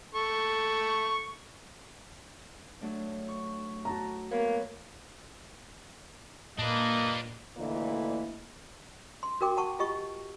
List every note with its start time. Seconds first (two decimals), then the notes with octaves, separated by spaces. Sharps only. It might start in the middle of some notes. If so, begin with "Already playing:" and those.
0.15 A4 C#6
2.81 F#3 A3 D4
3.28 C#6
3.85 F#4 A5 A#5
4.31 A#3 B3 B4 C#5
6.59 A#2 A#3 D4 B4 D#5
7.57 D2 A#2 D3 E3 A#3 D#5
9.23 C6
9.41 F#4 A#4 G5 D6
9.57 F#5 A5 C#6
9.79 F4 G4 D#5 C#6